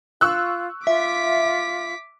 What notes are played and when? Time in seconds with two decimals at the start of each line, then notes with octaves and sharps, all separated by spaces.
0.21 F4 C#6 E6 F#6
0.87 F4 E5 D6 B6